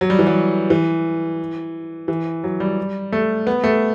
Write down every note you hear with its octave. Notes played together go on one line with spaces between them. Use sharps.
F#3
G3
E3
F#3
E3
E3
F#3
G3
A3
B3
A3